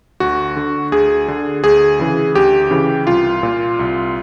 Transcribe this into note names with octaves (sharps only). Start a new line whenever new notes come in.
D2 F#4
D3
D2 G#4
D3
D2 G#4
C#3 E3
D2 G4
C#3 E3
C2 F4
A#2
C2